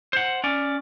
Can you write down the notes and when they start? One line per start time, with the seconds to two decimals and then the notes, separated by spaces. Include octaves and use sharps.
0.13 C5 F#5
0.44 C#4 D5